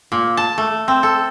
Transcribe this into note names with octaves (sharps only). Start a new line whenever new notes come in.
A#2
A5
A3
C4
A4